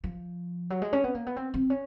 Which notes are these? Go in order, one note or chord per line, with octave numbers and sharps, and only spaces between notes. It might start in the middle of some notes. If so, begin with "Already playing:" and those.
F3
F#3
G#3
C#4
B3
A#3
B3
C4
C4
C#4